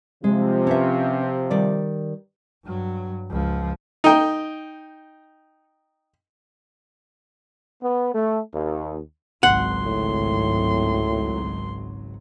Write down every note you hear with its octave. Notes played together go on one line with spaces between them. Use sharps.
C3 F3 G#3
C#4 B4 E5
D#3 G3 D5
G2 F#3
C#2 F3
D#4 G5
B3
A3
D#2
G#1 C#2 F#3 F#5 C6
A2